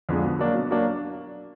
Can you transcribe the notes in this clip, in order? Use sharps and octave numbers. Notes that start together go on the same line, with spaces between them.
F2 D3 F3 G#3
B2
F#3 A#3 D4
B2
F#3 A#3 D4